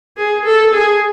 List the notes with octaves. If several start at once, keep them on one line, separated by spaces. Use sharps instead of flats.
G#4
A4
G#4